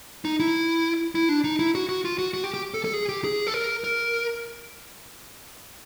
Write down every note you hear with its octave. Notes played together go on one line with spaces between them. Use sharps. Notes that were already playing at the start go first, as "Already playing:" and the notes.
D#4
E4
E4
D4
D#4
E4
F#4
F#4
F4
F#4
F#4
G4
G4
A4
A4
G#4
G4
G#4
A4
A#4
A#4